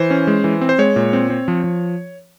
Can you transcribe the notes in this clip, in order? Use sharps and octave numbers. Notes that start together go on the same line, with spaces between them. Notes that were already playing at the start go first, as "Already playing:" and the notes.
Already playing: E3 C5
C#4
G#3
E3
C4
C5
G#3 C#5
A#2
C4
C4
F3
F3